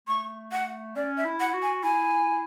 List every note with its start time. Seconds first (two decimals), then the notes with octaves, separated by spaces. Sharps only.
0.08 A3 C#6
0.52 F#5
0.96 C#4 D5
1.17 E5
1.25 E4
1.40 F#5
1.54 F#4
1.62 G#5
1.83 E4 G#5